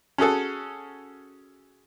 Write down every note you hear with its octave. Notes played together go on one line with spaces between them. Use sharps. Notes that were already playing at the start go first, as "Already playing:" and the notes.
C#4 F#4 G#4 A4